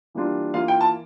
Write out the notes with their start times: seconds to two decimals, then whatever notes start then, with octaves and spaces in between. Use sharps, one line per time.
0.15 E3 G3 A#3 D4 F4
0.54 E3 A#3 F4 F5
0.68 G5
0.81 A5